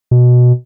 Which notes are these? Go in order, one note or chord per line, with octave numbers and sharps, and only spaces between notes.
B2